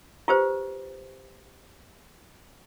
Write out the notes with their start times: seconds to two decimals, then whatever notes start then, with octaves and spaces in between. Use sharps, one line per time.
0.28 F4 G4 B4 C5